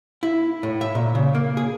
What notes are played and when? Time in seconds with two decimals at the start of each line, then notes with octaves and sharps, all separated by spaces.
0.23 E4
0.63 A2
0.81 E5
0.95 A#2
1.15 C#3
1.35 A#3
1.57 G#4